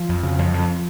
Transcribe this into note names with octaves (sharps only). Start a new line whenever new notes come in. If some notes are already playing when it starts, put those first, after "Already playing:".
Already playing: F3
F2
C#3
F2
F2